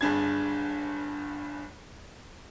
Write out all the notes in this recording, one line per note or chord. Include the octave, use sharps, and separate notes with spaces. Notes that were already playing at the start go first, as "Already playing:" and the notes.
G1 G2 D4 G#4 G#6